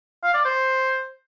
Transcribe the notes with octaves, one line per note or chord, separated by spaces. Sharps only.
F5
D5
C5